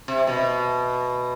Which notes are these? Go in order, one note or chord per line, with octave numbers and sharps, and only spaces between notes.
C3
B2